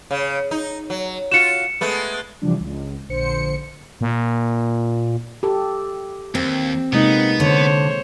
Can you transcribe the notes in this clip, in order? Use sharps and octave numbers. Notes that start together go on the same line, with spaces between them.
C#3
D#4
F#3
F4 F#4 C#7 E7
G#3 A3 B3
C3 E3 F3 G3 D4
C#2
A#1 D3 C5 C#7
A#2
G4 A4
D#2 C4
C3 G#3 A#3 B3 D#4
D3 C5 C#5